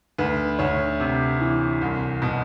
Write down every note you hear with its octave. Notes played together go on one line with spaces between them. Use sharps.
D2 B4
D2 C#5
C3
E3
C2
B2